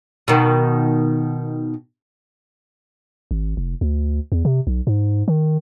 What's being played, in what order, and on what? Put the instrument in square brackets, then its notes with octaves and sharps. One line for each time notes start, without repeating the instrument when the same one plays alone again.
[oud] B2 D#3
[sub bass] G#1
F1
D2
E2
C3
B1
G#2
D#3